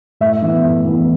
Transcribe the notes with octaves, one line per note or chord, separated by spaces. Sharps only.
A2 E5
E3 B3
A2
E3 B3